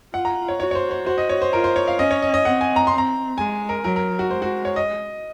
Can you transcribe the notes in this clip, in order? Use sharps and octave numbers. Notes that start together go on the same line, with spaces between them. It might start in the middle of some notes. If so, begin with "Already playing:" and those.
F4 F#5
A#5
C#5
F#4 C#5
C#5
C5
C5
F#4 C5
D#5
C#5
C5
F4 A#4
C5
C#5
F5
C#4 D#5
C#5
D#5
D#5
C4 F#5
G#5
A#5
C4 C6
A#5
G#3 G#5
A#4
F#3 A#4
A#4
F#4
G#3 C5
F#4
C#5
D#5